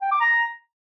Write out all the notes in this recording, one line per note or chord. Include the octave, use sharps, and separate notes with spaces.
G5
D6
A#5